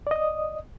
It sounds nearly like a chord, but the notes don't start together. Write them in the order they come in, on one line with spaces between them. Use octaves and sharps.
D5 D#5 D#6